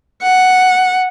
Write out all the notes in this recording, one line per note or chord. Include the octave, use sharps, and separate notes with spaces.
F#5